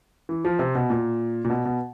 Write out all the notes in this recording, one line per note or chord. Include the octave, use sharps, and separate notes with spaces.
E3
F3
C3
B2
A#2
A#2
B2
B2